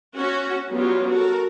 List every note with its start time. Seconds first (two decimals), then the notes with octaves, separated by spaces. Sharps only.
0.17 C#4 F#4
0.71 F#3 G3 B3 C#4 F4 G4
1.10 F#4 A4 A#4